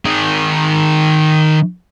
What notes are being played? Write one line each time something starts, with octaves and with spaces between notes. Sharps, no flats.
D#3 G#4